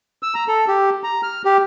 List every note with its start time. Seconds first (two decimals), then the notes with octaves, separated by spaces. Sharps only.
0.23 E6
0.35 A#5
0.48 A4
0.68 G4
1.04 A#5
1.23 F6
1.45 G4